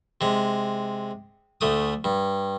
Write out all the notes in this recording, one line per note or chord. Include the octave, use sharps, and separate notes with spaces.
C3 G#3
D2 A3 D#6
G2